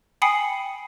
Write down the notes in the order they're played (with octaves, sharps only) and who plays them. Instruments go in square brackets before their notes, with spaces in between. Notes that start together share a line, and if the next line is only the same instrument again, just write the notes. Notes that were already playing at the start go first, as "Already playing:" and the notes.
[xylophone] G5 G#5 B5 D#6 C7 C#7